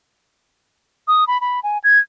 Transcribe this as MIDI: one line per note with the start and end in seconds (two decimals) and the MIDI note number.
1.08 1.24 87
1.27 1.40 83
1.41 1.60 83
1.63 1.78 80
1.84 1.99 92